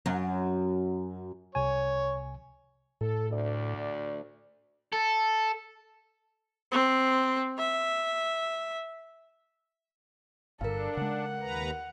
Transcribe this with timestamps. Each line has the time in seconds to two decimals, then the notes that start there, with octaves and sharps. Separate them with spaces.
0.06 F#2
1.55 C2 C3 C#5 G#5
3.01 A2 A4
3.31 D2 D5
4.93 A4
6.71 C4
7.58 E5
10.61 G1 G2 D3 D4 A4 A#4 F5
10.97 C#3 G#3 F#5
11.40 D#2 B4 A#5